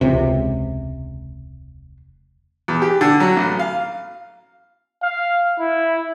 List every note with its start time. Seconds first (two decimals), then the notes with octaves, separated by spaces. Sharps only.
0.01 E1 C#2 C3
2.68 E2
2.82 G4
3.01 D3
3.20 F#3
3.37 A1
3.59 F5
5.03 F5
5.60 E4